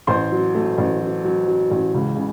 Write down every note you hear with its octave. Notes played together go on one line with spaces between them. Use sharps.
A1 C5 C6
F#3
A3
A1
F#3
F#3
F#3
A1
C#2
C#3